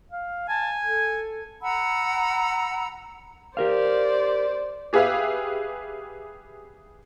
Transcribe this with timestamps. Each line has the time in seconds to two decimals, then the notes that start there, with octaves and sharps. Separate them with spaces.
0.12 F5
0.49 G#5 A5
0.82 A4
1.62 F#5 A#5 B5 E6
3.57 G4 A#4 C5 D5 F5
4.93 G4 G#4 B4 E5 F5